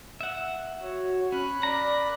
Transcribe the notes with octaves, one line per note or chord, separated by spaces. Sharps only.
E5 F#5
F#4 C#5
C#4 B5 F#6
A#4 D5 A#5